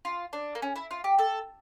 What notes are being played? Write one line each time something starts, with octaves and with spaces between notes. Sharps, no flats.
F4
D4
A#3
C#4
E4
F4
G4
A4